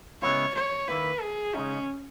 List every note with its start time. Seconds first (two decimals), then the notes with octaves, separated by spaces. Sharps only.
0.22 C#3 G#3 B3 E4 C#5
0.55 C#5
0.88 D#2 D#3 A#3 E4 B4
1.21 G#4
1.55 C#3 G#3 C#4 D#4